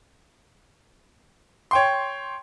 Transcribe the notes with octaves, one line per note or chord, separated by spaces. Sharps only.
C#5 G5 C6